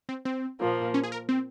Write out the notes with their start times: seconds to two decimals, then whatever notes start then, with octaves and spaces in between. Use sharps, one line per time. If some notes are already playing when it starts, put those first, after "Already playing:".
0.09 C4
0.25 C4
0.60 A#2 F3 A#3
0.94 C#4
1.04 G#4
1.12 A#4
1.29 C4